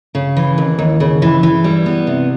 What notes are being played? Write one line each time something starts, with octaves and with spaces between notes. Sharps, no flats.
C#3
E3
D#2
D#2
C#3
E3
E3
G3
B3
C3